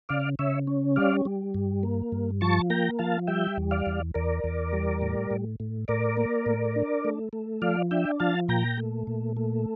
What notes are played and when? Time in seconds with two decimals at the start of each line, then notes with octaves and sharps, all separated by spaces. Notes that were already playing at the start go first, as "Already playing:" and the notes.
0.09 C#3 D5 F5
0.39 C#3 C#5 E5
0.67 C#4
0.96 G3 D5 F5
1.25 G3
1.54 G2
1.83 A#3
2.12 G2
2.41 F3 A5 C#6
2.70 A#3 G5 A#5
2.99 F3 F5 A5
3.27 G3 E5 G5
3.57 E2
3.71 D5 F5
3.86 E2
4.14 E2 A#4 D5
4.44 E2
4.73 G3
5.01 A2
5.31 A2
5.60 A2
5.88 A2 A#4 D5
6.17 A#3
6.46 A2
6.76 D4
7.05 A3
7.33 A3
7.62 F3 D5 F5
7.91 D4 E5 G5
8.20 F3 F5 A5
8.48 A#2 G5 A#5
8.77 A3
9.07 A#2
9.37 A3